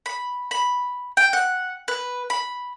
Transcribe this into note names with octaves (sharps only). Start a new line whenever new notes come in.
B5
B5
G5
F#5
B4
B5